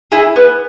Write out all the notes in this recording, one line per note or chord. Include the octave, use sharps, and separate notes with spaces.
E4 G#4
B3